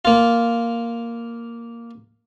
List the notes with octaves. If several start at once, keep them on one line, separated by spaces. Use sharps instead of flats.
A#3 F4